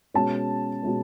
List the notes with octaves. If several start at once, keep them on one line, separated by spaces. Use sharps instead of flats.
B2 G#3 C#4 A5
B2 G#3 C#4